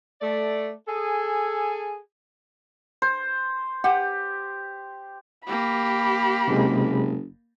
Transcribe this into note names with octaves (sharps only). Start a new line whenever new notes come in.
A3 D5
G#4 A4 G#5
C5
G4 B4 F#5
A#3 G4 B5
F#1 C3 G#3